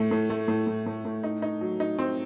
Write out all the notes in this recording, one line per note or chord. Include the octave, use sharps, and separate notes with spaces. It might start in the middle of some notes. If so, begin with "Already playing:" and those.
Already playing: A2 A3
A2
A3
A2
A2
A2
A2
D#4
D#4
F#3
D#4
C4